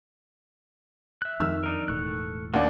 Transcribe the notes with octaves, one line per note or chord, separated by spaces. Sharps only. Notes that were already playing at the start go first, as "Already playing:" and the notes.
E5 F#6
F2 D#3 E6 F6
D4 D#4 A#4
E1 A2 A4 C#6 F#6
D#2 F#3 C4 D4 D#5 F#5